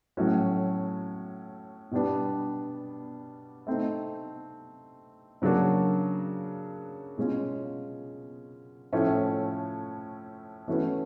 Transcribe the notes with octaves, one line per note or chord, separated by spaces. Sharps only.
A2 F#3 A3 C#4 F#4
B2 G3 B3 D4
A3 C4 D#4
C#3 F#3 A#3 D4 F#4
B2 G#3 C#4 F4
A2 F3 A3 C#4 E4
E3 A3 C#4 F#4 B4